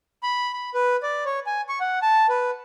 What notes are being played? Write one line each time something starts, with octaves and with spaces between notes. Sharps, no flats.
B5
B5
B4
D5
C#5
G#5
C#6
F#5
A5
B4